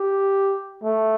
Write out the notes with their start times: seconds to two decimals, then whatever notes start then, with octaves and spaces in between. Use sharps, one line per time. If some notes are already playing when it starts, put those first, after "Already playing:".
Already playing: G4
0.84 A3